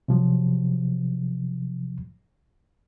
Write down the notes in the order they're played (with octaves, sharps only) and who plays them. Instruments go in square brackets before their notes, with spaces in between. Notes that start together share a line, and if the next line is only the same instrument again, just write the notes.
[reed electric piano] C3 F3 F#3